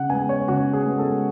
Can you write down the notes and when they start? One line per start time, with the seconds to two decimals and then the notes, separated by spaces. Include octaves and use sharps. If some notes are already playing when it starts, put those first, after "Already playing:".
Already playing: C#3 F#5
0.09 G#3 B3 G#5
0.29 C#5
0.48 C#3 F#4
0.73 G#4
0.86 G#3 B3
0.99 A4